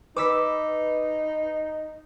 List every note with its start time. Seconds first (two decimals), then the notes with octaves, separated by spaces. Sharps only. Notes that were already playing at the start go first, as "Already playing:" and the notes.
0.17 D#4 B4 D6 E6 B6